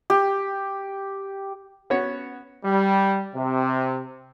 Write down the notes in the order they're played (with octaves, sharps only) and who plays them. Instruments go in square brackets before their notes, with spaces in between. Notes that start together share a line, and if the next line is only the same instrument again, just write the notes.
[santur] G4
[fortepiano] B3 C#4 F#4 C#5
[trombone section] G3
C3